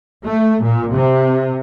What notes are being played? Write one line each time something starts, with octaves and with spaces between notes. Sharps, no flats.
A3
A#2
C3